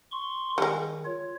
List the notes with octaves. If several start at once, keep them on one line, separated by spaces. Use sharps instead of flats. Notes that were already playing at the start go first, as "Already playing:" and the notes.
C6 C#6
D#3 G3 G#3
F4 C#5